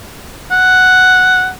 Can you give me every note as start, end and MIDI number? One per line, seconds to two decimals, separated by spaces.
0.51 1.49 78